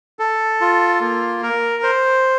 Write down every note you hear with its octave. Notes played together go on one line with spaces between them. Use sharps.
A4
F4
A#3
A#4
C5